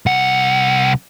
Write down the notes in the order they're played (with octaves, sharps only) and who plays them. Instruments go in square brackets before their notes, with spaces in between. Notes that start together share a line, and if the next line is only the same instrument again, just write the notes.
[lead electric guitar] C2 F#5